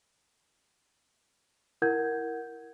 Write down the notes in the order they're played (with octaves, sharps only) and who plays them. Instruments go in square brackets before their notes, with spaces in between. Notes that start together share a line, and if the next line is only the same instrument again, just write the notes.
[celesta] E4 A#4 F#5 G6 G#6